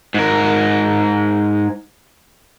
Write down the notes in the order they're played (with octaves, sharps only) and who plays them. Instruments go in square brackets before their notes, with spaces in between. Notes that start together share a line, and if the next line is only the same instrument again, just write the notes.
[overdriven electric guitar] G#2 A#4